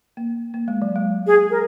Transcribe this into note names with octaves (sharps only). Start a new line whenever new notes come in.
A#3
A#3
G#3
F#3
G#3
G#4
A#4